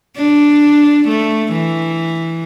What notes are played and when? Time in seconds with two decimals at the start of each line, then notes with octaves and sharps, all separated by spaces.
0.17 D4
1.08 A3
1.52 E3